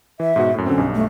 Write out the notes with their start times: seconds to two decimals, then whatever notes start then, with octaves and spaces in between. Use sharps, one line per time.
0.20 E3 E5
0.36 G#2 B2 F#4
0.54 F#2 A2
0.66 D3 F#3 C4 C#4
0.78 B1 G2
0.95 A3